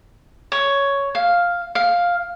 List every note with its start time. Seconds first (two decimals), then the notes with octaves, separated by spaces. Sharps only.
0.52 C#5
1.15 F5
1.75 F5